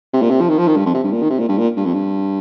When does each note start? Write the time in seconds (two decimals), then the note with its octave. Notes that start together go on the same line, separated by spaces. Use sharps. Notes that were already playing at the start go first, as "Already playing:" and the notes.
0.13 C3
0.22 A#2
0.31 C3
0.40 F3
0.49 D#3
0.58 F3
0.67 D#3
0.76 G2
0.86 F2
0.94 C3
1.03 G2
1.12 A#2
1.22 D#3
1.30 C3
1.39 A#2
1.48 G2
1.58 A#2
1.76 G2
1.85 F2
1.93 G2